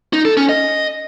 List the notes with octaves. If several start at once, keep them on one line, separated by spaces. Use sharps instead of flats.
D#4
A4
C#4
D#5